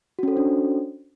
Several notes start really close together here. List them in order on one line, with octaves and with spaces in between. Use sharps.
F#4 C#4 A4 C5 D4